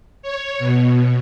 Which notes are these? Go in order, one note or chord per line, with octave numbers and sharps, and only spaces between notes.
C#5
B2